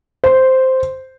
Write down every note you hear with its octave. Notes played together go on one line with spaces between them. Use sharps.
C5